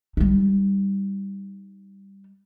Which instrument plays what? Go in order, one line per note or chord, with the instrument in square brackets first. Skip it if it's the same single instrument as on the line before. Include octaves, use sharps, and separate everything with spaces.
[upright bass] G3 D#4